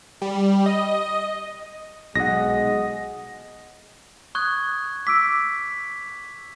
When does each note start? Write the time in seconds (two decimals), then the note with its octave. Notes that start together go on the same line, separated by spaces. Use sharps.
0.22 G3
0.66 D#5
2.15 B1 G#3 D#5 F#5 A#6
4.35 C#6 D#6 F#6 G#6
5.07 D6 E6 B6 D7